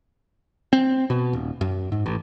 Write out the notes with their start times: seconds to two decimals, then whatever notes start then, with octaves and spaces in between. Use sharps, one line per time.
0.73 C4
1.10 B2
1.33 D#1
1.61 F#2
1.92 G#2
2.06 A1